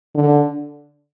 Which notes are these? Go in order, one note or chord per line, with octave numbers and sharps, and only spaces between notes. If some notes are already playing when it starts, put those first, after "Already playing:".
D3